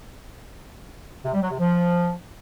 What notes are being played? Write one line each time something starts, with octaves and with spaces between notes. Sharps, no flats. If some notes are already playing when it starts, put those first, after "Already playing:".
C3
G3
F#3
C3
F3